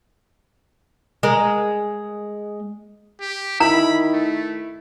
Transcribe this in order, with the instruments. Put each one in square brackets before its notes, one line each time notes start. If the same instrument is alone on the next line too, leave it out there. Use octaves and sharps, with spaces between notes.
[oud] G#3 A#4
[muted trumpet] G4
[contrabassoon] D#3 [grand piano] E4 [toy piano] A#5 [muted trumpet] B5
[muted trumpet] A3